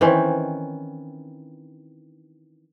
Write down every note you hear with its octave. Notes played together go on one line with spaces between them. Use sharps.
D#3 E3 C4 C#4